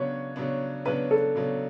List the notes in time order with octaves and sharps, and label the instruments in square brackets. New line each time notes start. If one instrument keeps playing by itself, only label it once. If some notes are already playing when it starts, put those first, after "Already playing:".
Already playing: [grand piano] C#3 F#3 B3 D4 [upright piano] C#5
[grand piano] C#3 F#3 B3 D4
[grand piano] C#3 F#3 B3 D4 [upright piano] B4
[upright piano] A4
[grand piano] C#3 F#3 B3 D4